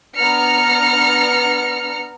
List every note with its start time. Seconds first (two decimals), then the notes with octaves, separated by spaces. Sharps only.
0.16 B3 D4 A#5 F6 C#7